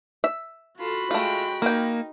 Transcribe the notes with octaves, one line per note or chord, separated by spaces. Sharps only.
E5
F4 F#4 A4 B5
G#3 A3 F4 G5
A#3 D#4 A#4 G5